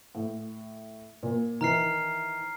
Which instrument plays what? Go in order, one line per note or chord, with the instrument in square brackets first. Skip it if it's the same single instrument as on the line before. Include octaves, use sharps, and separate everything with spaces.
[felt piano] A2
A#2
[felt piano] D#3 E3 [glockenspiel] A#5 F6 C7